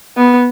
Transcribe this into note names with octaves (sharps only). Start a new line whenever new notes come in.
B3